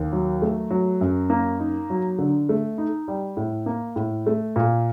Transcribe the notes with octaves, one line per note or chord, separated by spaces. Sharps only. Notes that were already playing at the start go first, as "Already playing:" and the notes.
Already playing: D#2
F#3
A3
F#3
F#2
A#3
D#4
F#3
D3
A3
D#4
G3
A2
A#3
A2
A3
A#2